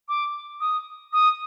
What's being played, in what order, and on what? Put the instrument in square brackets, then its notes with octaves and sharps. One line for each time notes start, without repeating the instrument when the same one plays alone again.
[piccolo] D6
D#6
D#6